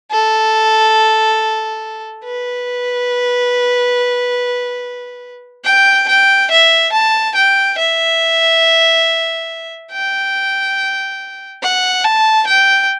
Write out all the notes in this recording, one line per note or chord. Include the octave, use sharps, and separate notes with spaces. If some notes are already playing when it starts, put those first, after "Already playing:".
A4
B4
G5
G5
E5
A5
G5
E5
G5
F#5
A5
G5